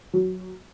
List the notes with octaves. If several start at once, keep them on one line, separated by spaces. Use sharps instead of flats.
F#3